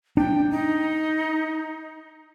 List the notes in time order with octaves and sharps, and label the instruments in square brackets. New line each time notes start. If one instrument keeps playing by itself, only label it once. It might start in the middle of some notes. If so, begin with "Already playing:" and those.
[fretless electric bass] D4 [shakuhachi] G5
[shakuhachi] D#4